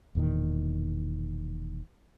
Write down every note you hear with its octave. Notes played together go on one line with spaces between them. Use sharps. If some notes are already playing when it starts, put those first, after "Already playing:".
E1 E2 A#2 D#3